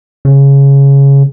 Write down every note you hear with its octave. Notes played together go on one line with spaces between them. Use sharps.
C#3